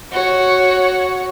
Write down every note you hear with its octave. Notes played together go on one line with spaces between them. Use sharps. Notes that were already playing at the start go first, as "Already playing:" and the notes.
F#4 C#5